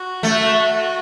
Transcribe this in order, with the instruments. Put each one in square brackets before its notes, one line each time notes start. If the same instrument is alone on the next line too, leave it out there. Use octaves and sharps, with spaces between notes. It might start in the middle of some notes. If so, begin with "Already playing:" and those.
Already playing: [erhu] F#4
[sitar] A3